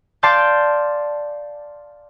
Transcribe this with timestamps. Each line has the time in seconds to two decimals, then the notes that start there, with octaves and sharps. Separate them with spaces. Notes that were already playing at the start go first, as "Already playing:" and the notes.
0.23 D5 F5 A5 C6 D6 G6